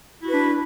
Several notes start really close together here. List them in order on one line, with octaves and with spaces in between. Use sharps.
E4 F#4 B4 D4